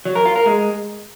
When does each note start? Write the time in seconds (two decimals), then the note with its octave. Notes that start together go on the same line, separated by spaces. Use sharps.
0.05 F#3
0.15 A#4
0.26 F4
0.36 A#4
0.46 G#3